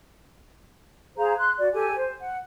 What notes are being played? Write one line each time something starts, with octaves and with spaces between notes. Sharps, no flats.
G#4 C5 F5 A#5
C6 F#6
F#4 D5
G4 A4 G#5
C5
F#5